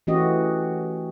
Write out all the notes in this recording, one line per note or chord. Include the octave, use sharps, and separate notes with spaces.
E3 A3 C#4 F#4 G4 D#5